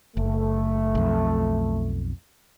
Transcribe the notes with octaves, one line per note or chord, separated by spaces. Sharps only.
F#1 A3
B1 F2